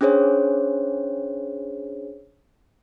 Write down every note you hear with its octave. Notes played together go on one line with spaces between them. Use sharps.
C#4 D4 G#4 C5 C#5